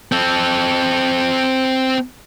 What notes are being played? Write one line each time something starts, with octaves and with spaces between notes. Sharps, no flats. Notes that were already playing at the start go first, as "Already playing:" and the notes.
C4 A4